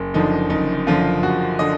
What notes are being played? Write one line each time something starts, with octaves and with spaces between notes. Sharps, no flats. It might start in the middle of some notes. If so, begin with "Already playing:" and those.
Already playing: F#1
F#2 D3 F3 D#4
F#1 D#4
F#2 D3 F3 F4
F#1 F#4
D3 D#5